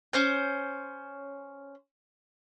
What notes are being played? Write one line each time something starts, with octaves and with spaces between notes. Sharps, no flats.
C#4 C5 G6